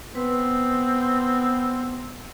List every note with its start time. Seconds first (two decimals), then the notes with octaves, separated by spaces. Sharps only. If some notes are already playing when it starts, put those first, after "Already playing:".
0.15 B3 C4 B4